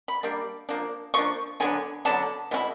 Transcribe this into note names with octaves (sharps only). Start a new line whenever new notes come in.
B5
G3 A#3 D4
F3 A#3 D4
F3 A#3 D4 C#6
D3 F#3 B3 D4 G#5
D3 F#3 B3 D4 A5
B2 G#3 C#4 E4